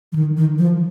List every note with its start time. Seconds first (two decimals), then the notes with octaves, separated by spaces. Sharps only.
0.12 F3
0.15 D#3
0.37 D#3
0.58 F3